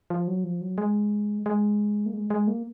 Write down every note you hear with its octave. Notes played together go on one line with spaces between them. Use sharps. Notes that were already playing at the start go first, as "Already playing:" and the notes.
F3
F#3
F3
F#3
G#3
G#3
A#3
G#3
G#3
A#3